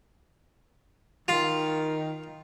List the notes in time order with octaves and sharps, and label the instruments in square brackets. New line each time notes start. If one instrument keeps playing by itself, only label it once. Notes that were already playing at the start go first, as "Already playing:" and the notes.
[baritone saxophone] D#3 [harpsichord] F4